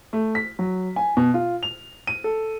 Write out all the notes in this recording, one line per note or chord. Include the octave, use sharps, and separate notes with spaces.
A3
B6
F#3
G#5
B2
F4
F7
D#7
A4